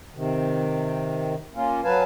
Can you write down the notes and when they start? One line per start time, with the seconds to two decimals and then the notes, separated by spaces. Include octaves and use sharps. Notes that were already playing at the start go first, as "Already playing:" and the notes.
0.15 C3 D#3
1.55 A#3 C#4 F4
1.84 F#3 B4 F5 G#5 A5